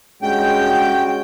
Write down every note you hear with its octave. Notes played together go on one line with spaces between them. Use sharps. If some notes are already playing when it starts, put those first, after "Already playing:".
G2 G#3 C#4 F#4 G5